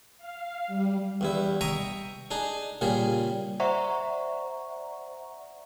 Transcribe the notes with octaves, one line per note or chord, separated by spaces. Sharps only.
F5
G3
E2 G2 E4
D#5 E5 G5 A#5 C#6 D#6
D4 D#4 G#4
A#2 C#3 G3 G#4
C5 D5 E5 F#5 A#5 C#6